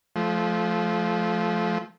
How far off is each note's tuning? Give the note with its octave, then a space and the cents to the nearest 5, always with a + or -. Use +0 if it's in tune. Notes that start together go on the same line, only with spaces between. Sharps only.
F3 +0 A3 -30